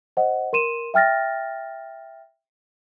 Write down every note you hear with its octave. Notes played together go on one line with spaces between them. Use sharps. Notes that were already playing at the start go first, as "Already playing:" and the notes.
C5 D#5 F#5
A#4 C6 D#7 E7
E5 G5 F6 A6 A#6